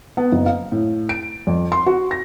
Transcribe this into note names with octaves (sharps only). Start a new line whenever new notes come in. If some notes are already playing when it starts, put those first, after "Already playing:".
B3
F#1
F5
A2
D7
F2
C6
F#4
A#6